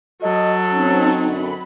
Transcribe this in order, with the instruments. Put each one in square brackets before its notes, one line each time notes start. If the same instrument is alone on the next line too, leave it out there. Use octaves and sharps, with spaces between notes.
[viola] F#3 [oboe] A4 [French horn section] D#5
[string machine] C4 D#4 [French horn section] C#4
[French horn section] F#2 D3 [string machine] B5